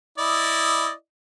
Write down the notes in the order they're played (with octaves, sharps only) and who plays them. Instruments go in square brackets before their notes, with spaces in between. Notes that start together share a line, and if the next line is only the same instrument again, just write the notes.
[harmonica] E4 D5 D#5